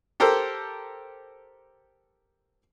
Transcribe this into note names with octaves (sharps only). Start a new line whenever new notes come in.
G4 A4 A#4 C5